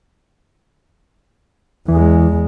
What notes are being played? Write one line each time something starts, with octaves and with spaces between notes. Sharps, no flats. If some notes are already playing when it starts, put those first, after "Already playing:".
E2 E3 G#3